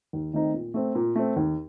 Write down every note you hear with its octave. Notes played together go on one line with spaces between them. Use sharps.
D#2
D#3 A3 C4 D#4
A#2
A3 C4
A#2
A3 C4
D#2